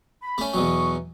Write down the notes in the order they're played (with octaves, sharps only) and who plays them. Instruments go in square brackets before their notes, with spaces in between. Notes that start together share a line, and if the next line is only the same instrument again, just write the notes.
[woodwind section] B5
[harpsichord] A3 C#4
[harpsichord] E2 B2 F#3 [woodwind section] C#6